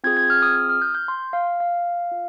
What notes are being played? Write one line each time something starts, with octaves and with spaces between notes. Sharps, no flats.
C4 F4 G#4 G#6
G#6
F6
D#6
D#6
F6
G6
G6
C6
F5
F5
F4